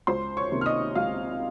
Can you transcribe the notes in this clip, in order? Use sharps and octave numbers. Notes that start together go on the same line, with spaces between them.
C#2 C5 C6
C#5 C#6
C3 D#3 A#3
F6
D#5 D#6
C#2 F5 F6